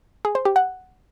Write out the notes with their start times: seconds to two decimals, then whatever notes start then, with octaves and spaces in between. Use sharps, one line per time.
0.25 G#4
0.35 C5
0.45 G4
0.56 F#5